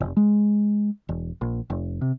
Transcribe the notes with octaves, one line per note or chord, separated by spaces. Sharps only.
F1
G#3
E1
A#1
F1
C3